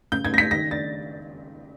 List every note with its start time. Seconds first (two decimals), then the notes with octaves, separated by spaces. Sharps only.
0.12 C#3 G6
0.25 G#6
0.32 C#4 A#6
0.38 B6
0.51 D#3 A#6
0.71 D4 A6